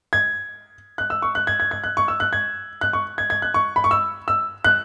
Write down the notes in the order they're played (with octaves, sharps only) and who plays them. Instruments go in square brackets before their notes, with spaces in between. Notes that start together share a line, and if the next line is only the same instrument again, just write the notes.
[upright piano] G#6
F#6
E6
C#6
F#6
G#6
G#6
G#6
F#6
C#6
E6
F#6
G#6
F#6
C#6
G#6
G#6
F#6
C#6
B5
C#6
E6
E6
F#6